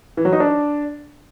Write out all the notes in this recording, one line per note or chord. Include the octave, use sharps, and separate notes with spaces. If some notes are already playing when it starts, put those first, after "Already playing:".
E3
F#3
D#4
D4